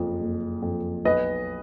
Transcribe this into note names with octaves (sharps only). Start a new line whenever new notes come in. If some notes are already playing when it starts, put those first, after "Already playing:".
Already playing: F#1 F2 F3
F#1
F2 F3
B1 B4 D#5